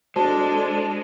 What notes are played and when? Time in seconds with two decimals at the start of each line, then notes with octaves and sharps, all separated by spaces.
0.16 G#3 D4 F#4 A4 C5 A5